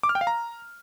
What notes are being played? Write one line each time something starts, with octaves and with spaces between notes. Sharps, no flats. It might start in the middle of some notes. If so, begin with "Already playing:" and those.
D6
F6
G5
F5
A#5